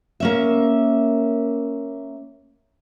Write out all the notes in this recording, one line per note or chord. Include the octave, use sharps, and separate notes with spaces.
A#3 C#4 E5